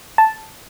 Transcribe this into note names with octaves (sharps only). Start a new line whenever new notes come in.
A5